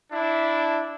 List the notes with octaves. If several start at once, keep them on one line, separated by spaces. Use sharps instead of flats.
D4 E4